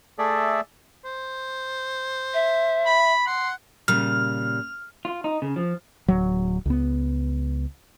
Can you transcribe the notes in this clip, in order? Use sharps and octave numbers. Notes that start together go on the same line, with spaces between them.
A3 G#4 A4 D5 E5
C5
E5
B5
F#5 C6
A#2 C#3 G3 F6
F4
D#4
C#3
F3
D1 F#3
C#2 B3